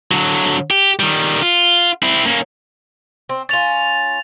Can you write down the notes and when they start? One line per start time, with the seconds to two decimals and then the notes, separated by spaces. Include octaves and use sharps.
0.11 D3 F#3
0.71 G4
1.00 D#3 G3
1.42 F4
2.03 C4 E4
2.26 A#3 C#4
3.29 C4
3.49 C#4 F4 A6 F7